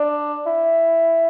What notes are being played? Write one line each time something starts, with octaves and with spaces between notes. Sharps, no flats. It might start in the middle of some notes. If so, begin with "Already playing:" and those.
Already playing: D4
E4